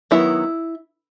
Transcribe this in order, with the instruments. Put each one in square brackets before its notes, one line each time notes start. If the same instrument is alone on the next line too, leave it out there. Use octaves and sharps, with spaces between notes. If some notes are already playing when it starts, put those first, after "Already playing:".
[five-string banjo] D#3 F#3 B3 E4